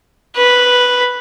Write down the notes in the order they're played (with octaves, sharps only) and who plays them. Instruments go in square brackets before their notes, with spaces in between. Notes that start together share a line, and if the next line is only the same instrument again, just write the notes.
[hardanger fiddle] B4